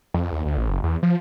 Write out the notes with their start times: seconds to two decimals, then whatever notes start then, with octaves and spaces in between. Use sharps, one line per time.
0.14 F2
0.32 D#2
0.46 D2
0.58 A1
0.69 F#1
0.84 E2
1.03 F3